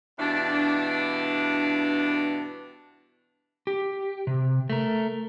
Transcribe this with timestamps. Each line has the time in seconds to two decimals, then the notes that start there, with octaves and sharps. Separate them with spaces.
0.19 G2 B2 E3 D4
3.67 G4
4.27 C3
4.70 A3 A#4